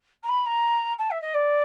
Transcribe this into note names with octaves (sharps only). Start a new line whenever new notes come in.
A#5
B5
A#5
A5
E5
D#5
D5